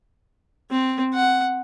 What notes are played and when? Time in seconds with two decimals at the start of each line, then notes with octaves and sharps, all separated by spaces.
0.70 C4
1.14 F#5